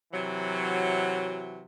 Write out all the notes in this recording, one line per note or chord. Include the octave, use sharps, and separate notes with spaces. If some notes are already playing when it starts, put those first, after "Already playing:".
C3 E3 F#3